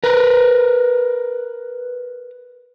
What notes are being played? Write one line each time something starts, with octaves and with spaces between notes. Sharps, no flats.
A#4 B4